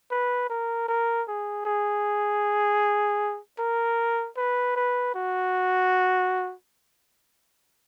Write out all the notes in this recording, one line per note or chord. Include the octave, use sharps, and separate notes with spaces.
B4
A#4
A#4
G#4
G#4
A#4
B4
B4
F#4